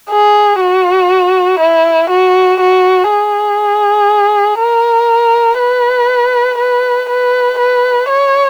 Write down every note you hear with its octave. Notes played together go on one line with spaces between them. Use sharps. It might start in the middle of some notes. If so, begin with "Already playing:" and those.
G#4
F#4
E4
F#4
F#4
G#4
A#4
B4
B4
B4
B4
C#5